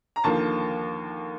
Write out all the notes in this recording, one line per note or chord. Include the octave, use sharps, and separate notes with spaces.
A#5
D#2 D3 F3 A#3 A5